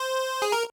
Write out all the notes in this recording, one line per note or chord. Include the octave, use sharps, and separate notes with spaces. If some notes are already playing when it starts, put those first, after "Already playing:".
Already playing: C5
G#4
A#4